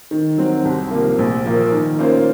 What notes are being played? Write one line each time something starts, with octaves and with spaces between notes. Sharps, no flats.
D#3
F#3 C4 F#4
C2
C3 F3 A#3
A#1
A#2 F3 A#3
D#3
A#3 C#4 F4 C5